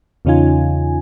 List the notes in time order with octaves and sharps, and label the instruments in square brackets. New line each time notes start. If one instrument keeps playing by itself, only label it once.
[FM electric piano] E2 C#3 C#4 D#4 F4 G#5